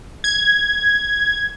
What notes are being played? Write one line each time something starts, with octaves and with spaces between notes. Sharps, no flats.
G#6